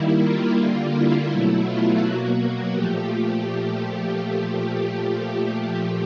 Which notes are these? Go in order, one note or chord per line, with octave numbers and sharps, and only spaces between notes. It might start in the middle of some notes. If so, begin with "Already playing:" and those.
Already playing: D#3 G3 A#3 E4
F4
D3 G3 A#3
E4
B2 F#3 A3
F4
B2 F#3 A#3 F#4
A#2 F3 A3 G4